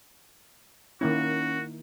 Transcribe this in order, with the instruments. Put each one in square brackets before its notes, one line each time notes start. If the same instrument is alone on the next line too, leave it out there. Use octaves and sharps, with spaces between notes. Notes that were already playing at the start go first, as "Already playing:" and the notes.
[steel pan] D#3 A#3 E4 [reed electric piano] C#4 [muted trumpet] F#4